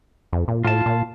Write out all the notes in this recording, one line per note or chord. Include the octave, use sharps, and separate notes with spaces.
F2
A#2
A2 F4 A5
A#2